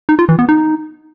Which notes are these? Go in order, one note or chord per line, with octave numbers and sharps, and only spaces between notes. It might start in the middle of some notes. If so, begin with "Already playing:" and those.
D#4
F4
E3
B3
D#4